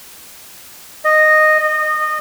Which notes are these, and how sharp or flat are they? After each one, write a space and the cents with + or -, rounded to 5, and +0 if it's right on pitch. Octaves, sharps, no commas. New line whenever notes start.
D#5 -10
D#5 -25